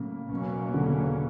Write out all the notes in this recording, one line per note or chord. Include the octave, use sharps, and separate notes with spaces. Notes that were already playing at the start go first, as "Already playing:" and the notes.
Already playing: A2 C#3 F#3 A#3
E2 B2 F#3 A#3 C#4
D3
C#3